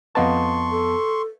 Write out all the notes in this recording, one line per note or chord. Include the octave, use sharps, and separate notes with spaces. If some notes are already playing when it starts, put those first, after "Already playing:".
F2 B3 B4 D#5 F5 A5 C6 C#6
A4